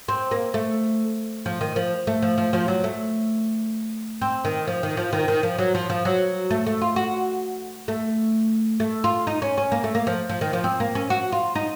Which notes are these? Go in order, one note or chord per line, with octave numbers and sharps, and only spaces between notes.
C4
A#3
A3
F3
D#3
F3
A3
F3
F3
F3
F#3
A3
C4
D#3
F3
D#3
F3
D#3
D#3
F3
F#3
F3
F3
F#3
A3
A3
F4
F#4
A3
A3
F4
D#4
C#4
C#4
A#3
A3
A#3
F3
F3
D#3
F3
C4
A#3
C#4
F#4
F4
D#4